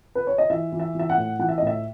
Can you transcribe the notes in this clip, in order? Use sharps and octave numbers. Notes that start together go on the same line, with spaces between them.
B4
C#5
D#5
E3 E5
E3
E5
E3 E5
F#5
A2
E3 F#5
E5
D#5
A2 E5